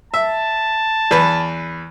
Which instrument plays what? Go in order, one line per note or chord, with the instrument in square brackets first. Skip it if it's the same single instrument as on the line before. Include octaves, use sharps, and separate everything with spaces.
[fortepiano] E5 [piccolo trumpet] A5
[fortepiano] E2 B4